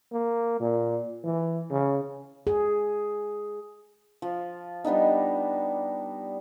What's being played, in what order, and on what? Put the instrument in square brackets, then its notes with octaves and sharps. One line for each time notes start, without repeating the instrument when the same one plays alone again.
[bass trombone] A#3
A#2
E3
C#3
[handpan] G#4
[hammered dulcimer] F3
G3 B3 D4 D#4